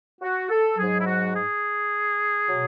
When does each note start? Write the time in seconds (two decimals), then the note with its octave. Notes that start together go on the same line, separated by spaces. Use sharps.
0.22 F#4
0.50 A4
0.78 G#2 F#3 G#4
1.00 E4
1.07 F#4
1.36 G#4
2.49 B2 F#3